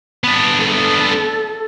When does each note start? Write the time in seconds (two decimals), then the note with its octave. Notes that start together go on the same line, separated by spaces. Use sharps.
0.24 B3 D4
0.59 A4